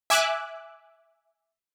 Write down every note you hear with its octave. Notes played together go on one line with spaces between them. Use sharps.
E5 G#5 D6 E6 F#6